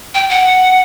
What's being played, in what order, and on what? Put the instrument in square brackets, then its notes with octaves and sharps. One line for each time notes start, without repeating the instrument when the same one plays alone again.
[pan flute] G5
F#5